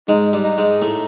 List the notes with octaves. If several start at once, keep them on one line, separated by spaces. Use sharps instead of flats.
G#2 G#3 D#4
G2 G3
D#4
G#2 G#3
A2 A3